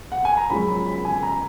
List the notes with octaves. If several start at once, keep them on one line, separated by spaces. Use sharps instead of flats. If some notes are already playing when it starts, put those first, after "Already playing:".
F#5
G#5
A#5
F#2 F3 G#3 C#4 B5
B5
B5
G#5
A#5